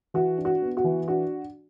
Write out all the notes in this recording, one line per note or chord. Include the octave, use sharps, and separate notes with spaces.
E3 F#4
D4
F#4
B3
F#4
E3
D4 F#4